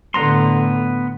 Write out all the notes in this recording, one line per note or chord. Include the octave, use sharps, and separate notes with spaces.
A2 D3 B3 A#5 C6